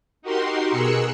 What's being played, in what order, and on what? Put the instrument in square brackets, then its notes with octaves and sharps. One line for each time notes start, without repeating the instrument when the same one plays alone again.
[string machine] D#4 F#4 G4 A#4 C6
B2 G#4 A#4 E6 F#6 C#7